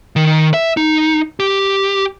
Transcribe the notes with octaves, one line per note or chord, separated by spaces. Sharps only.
D#3
E5
D#4
G4